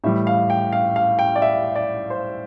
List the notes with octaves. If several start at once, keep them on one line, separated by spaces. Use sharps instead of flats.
A2 E3 G3 E5
F5
G5
F5
F5
G5
D5
E5
D5
C5